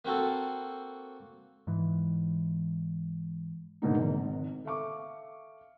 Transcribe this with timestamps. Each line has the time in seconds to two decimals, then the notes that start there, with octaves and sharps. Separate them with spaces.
0.05 A#3 C4 F#4 A4
1.67 G#2 E3
3.82 G#2 B2 D3 G#3 A#3 D#4
4.00 G#1
4.65 A4 E5 F5 C#6 D6